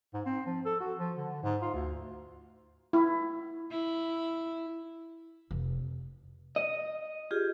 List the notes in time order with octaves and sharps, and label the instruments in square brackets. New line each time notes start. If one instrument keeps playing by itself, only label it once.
[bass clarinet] G#2
C4
F3
A4
F#4
F3
D3
G#2
F4
D2
[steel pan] E4
[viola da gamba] E4
[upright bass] F1
[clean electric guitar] D#5
[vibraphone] F4 G4 G#4